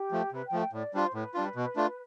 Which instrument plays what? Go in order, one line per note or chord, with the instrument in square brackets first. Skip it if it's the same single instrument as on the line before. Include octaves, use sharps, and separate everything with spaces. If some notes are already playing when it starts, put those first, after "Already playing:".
Already playing: [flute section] G4
[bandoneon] F3 A3
[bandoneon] C3 [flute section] B4
[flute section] G5
[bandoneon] F3 A3
[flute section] G5
[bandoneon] A2 [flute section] D5
[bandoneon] G3 D4 F4 [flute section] C5
[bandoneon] A2 [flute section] B4
[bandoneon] G3 D4 F4
B2
A3 D4 F4